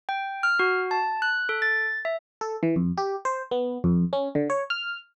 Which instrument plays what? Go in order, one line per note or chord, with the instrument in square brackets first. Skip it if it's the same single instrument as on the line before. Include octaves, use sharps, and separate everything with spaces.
[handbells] G5
F6
F#4
A5
F#6
A4
A6
E5
[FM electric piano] A4
E3
F2
G4
C5
B3
F2
C#4
D3
C#5
F6